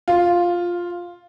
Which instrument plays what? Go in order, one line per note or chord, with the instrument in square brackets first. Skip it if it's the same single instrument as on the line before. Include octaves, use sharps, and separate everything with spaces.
[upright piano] F4